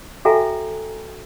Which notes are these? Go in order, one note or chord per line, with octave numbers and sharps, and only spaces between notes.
F#4 A4 E5 G5 G#5 A#5